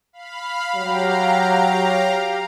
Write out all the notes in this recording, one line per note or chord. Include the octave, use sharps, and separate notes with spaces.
F5 B5
F#3 G4 F5 A#5